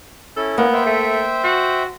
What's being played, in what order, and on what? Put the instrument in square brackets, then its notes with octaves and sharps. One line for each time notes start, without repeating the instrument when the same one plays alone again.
[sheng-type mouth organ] C#4 E4 [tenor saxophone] A4
[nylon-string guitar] A#3 [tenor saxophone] B3
[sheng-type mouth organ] C5 E5 G5
[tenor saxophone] A3
F#4